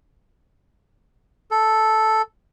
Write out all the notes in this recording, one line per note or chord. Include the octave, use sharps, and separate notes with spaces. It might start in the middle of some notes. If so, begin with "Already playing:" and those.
A4